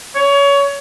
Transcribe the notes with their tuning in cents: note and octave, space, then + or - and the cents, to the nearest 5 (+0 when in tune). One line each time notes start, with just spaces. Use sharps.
C#5 +25